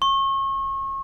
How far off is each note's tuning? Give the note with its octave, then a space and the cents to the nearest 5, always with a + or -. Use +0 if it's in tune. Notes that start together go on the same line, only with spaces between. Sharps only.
C#6 -35